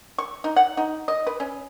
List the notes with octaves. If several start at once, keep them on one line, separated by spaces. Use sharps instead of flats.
C#6
D#4
F#5
D#4
D#5
B4
C#4